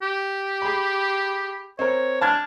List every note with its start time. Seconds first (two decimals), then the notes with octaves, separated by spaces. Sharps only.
0.02 G4
0.62 G#4 B5
1.79 C4 A#4 C#5
2.21 D4 A5 F6 G#6